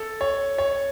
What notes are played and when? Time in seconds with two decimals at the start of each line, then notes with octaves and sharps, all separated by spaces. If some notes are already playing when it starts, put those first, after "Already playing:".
Already playing: A4
0.21 C#5
0.58 C#5